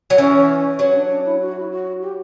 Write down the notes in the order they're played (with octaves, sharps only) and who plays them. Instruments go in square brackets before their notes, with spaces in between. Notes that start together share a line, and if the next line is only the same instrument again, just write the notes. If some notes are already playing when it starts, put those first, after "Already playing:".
[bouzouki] F#3
[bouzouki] E3 [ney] C#4
[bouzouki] F#3 [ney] C#4
[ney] D4
D4
E4
F#4
E4
F#4
G4